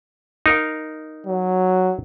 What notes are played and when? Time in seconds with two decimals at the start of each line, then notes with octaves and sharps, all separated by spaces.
0.46 D#4 A#4 F5
1.27 F#3